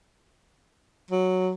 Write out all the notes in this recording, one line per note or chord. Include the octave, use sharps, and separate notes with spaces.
F#3